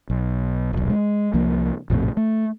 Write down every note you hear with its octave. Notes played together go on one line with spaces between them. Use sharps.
B1
D#1 B1
G#3
C2 F3 A#3
A#1 F2 A2 C3
A3